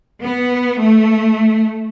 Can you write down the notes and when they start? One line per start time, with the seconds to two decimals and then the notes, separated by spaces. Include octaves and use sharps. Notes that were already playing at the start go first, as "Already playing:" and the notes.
0.24 B3
0.81 A3